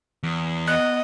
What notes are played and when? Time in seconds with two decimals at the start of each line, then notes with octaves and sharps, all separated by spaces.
0.23 E2
0.68 B3 D#5 F#6